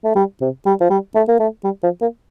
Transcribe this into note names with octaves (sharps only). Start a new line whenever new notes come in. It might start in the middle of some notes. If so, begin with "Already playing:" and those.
A3
G3
C3
G3
F3
G3
A3
A#3
A3
G3
F3
A#3